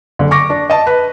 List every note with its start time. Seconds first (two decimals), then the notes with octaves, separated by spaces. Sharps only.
0.19 F#1 D3
0.31 C#6 D6 A#6
0.50 D4
0.70 D#5 A5
0.87 B4